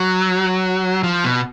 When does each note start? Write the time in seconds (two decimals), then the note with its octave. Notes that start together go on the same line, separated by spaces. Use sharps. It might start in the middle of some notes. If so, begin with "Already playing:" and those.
Already playing: F#3
1.03 F3
1.24 B2